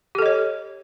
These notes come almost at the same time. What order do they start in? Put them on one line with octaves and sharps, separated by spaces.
G4 A4 D#5 C#5